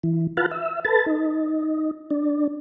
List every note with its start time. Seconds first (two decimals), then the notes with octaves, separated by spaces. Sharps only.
0.03 E3
0.37 F4 B4 F5 F#5 A5
0.51 E5
0.85 A4 B4 A5
1.06 D#4
2.11 D4